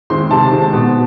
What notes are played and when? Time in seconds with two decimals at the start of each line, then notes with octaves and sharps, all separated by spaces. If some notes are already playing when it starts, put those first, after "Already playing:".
0.10 D#3 G#3 C4 C6
0.31 C3 A5
0.51 D#3 G#3 C4
0.73 B2